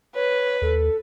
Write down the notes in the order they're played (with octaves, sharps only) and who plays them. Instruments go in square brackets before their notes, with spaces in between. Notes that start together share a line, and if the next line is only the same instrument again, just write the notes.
[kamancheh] B4 [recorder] C#5
[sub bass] D#2 [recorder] A4